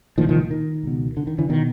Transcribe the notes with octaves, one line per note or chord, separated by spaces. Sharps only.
C2 A#2 D#3 F3
D#3 F3
D#3
C#2 B2
D3
D#3
D3 E3
B2 D#3